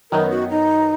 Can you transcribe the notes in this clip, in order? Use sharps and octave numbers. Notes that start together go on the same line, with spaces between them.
F#2 D#3 F#3 B3 D#4 A#4
F#4
D#4